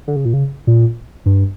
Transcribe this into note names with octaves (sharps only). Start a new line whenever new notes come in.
D3
C#3
A#2
C#3
A#2
G2